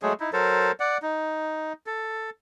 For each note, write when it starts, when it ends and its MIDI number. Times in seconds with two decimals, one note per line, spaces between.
0.02 0.13 54
0.02 0.13 56
0.02 0.13 57
0.02 0.13 68
0.20 0.30 63
0.20 0.30 64
0.33 0.72 54
0.33 0.72 69
0.33 0.72 70
0.33 0.72 72
0.80 0.98 74
0.80 0.98 78
1.02 1.73 63
1.86 2.30 69